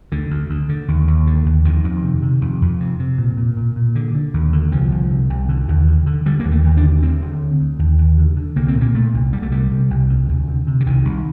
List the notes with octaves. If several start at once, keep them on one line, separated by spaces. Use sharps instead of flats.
D2 D3
D2
D2
D3
D#2
D#2
D3
D#2
F2 D#3
F2
C3
C3
F2
F2
C3
C3
A#2
A#2
A#2
A#2
D3
D3
D#2
D3
C2 F3
C2
C3
C2
D3
D#2
D3
D3
D3 G3
A#3
D#2
A3
D#2
D4
D3
D2 C4
D3
D2
D2
D#2
D#2
D3
D3
C2 A#3
C4
A#2
A#3
A#2 A3
C2
C2 G3
A3
C3 G3
C3
C2
D2
D2
C3
C3
D3
C2 D#3
C2